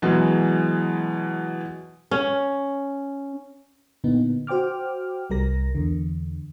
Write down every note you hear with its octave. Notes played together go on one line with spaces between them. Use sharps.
B2 E3 F#3 G#3
C#4
A#2 D3 A#3 B3 D#4
F#4 C5 G5 D6 F6
C2 G3 A#4 A#6
E2 D3